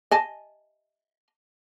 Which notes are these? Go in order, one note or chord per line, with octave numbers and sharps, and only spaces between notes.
D#5 G#5 A5